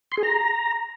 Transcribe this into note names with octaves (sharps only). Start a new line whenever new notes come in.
C6
G#4
A#5